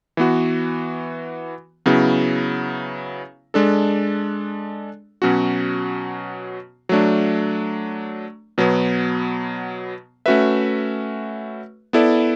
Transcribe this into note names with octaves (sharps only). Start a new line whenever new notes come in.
E3 B3 F#4
C#3 F#3 B3 E4
G#3 D4 A4
B2 F#3 C#4 F#4
F#3 A3 D4
B2 F#3 B3
A3 C#4 F#4 B4 E5
B3 E4 A4 D5